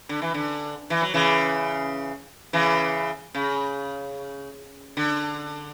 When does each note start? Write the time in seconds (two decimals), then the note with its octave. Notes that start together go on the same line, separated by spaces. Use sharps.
0.09 D3
0.22 E3
0.34 D3
0.90 E3
1.02 F#3
1.14 C#3 E3
2.53 C#3 E3
3.35 C#3
4.97 D3